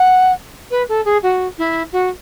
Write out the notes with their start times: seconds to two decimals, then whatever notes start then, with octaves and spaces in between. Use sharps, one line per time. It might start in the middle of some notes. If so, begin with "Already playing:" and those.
Already playing: F#5
0.70 B4
0.89 A4
1.05 G#4
1.22 F#4
1.58 E4
1.92 F#4